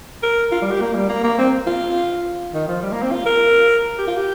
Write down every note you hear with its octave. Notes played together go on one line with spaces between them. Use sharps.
A#4
F4
G3
G4
A#3
G3
A#3
A#3
C4
F4
D#3
F3
G3
A#3
C4
F4
A#4
G4
F4
G4